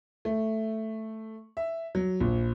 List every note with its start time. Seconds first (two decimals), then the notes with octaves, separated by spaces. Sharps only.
0.25 A3
1.57 E5
1.95 F#3
2.20 A#1